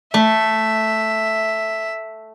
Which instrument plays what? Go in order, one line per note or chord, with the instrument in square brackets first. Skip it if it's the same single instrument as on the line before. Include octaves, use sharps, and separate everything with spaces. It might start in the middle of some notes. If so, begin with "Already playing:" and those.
[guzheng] A3 [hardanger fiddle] E5